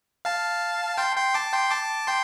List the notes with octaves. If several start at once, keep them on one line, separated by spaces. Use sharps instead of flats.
F5 A5
G5 C6
G5 C6
A5 D6
G5 C6
A5 D6
G5 C6